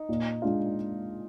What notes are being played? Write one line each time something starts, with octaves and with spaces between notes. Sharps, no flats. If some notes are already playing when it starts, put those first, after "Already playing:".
Already playing: D#4
A#2
G#3 D4 F4